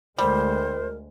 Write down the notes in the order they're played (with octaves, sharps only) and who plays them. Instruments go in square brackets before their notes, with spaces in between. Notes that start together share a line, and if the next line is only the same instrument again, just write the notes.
[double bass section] D2 G#3 [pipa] G3 [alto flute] A#4 [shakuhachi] C5